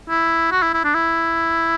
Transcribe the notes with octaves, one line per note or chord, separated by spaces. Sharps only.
E4
F#4
E4
E4
D4
E4